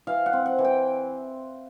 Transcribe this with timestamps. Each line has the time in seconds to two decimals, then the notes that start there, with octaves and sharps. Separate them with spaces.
0.07 E3 F5
0.26 F#5
0.33 C4
0.46 F#5
0.58 E3
0.64 G5